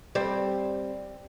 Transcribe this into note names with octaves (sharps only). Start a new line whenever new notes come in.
G3 C4